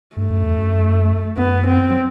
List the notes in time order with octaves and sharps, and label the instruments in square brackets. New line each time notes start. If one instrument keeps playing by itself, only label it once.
[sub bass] G2 [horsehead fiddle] A3
[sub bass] F#2
E2
F#2
[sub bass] F#2 [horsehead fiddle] B3
[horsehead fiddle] C4
[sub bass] F#3